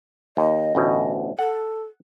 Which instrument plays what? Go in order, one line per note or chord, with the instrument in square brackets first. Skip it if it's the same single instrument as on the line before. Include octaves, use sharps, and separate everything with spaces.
[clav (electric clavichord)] D#2 [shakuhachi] D#5
[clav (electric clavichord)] A1 D2 B2
[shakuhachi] A4 [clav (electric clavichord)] F#5